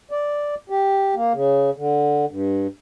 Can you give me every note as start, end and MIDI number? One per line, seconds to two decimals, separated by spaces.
0.11 0.55 74
0.70 1.15 67
1.15 1.33 58
1.33 1.70 49
1.76 2.25 50
2.30 2.67 43